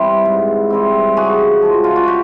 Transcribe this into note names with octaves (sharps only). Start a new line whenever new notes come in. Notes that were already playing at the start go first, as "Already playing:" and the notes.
Already playing: E3 G3 C4
G#2
E3 G3 C4
C#3 F#4 G#4
F3 G#3
F4
F#4
G4